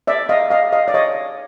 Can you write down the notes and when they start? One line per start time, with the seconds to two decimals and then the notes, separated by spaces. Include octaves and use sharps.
0.07 D5 E5
0.29 D#5 F5
0.50 D#5 F5
0.73 D#5 F5
0.88 D5
0.94 C#5 D#5